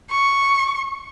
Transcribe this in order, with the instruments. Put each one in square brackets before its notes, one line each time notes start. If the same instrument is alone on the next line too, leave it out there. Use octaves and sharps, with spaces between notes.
[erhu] C#6